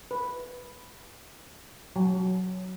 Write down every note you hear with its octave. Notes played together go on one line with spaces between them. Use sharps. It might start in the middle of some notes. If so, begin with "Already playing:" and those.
B4
F#3